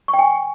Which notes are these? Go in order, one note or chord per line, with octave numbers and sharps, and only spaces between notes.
C#6
G5
G#5